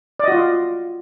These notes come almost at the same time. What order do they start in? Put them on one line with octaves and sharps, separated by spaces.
D5 D#5 F#4 F4